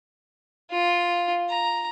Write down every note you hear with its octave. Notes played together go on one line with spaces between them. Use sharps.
F4
A#5